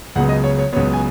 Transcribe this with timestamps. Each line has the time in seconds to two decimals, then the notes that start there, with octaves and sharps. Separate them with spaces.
0.16 C#2 C#3 F#3 B3 F#5
0.29 D#5
0.44 C#5
0.59 C#5
0.73 C#2 C#3 F#3 B3 C#5
0.93 G#5